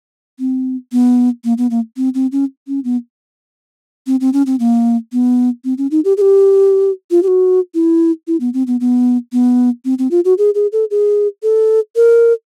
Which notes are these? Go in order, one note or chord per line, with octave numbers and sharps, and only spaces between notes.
C4
B3
A#3
B3
A#3
C4
C4
C#4
C#4
B3
C4
C4
C#4
C4
A#3
B3
C4
C#4
D#4
G4
G#4
G4
F4
G4
F#4
E4
E4
B3
C4
B3
B3
B3
C4
C4
F4
F#4
G#4
G#4
A4
G#4
A4
A#4